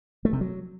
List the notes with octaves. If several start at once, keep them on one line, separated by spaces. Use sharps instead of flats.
A3
C3
F#3